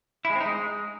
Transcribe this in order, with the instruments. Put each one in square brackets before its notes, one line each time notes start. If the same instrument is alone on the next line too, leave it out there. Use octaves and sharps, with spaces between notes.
[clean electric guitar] E4
G#3
C4
D#4
G#3